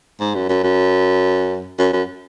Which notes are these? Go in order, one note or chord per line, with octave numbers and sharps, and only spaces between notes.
G#2
F#2
F#2
F#2
F#2
F#2